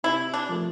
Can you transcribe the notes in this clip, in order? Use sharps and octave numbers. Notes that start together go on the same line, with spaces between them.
C3 E4
D4
F3 A3